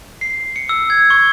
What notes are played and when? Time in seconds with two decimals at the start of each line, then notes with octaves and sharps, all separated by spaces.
0.21 C7
0.56 C#7
0.69 E6
0.90 G#6
1.10 C#6